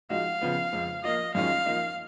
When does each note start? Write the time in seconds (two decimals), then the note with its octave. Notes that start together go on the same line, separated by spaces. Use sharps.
0.10 F3 G#3 D#4 F#4 F5
0.41 C#3 F3 B3
0.72 F2 F3 G#3
1.04 F3 A#3 F4 D#5
1.35 F#2 D#3 G#3 C#4 F4 F5
1.66 F3 A#3 D#4